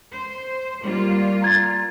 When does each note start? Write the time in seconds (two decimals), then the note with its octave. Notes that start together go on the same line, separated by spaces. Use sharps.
0.13 C5
0.83 G3 A#3 F4
1.42 A#5 G#6 A6